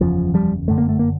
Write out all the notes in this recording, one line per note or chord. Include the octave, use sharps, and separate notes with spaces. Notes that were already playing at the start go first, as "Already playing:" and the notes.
F#1 E2 C#3 F3
F3 G3
G1 F#2 D3 A3
A#3
A3
A#3